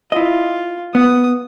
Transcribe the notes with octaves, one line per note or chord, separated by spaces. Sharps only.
E4 F4 D#5
B3 D#6